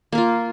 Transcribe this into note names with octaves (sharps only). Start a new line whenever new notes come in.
A#3 F4 A#4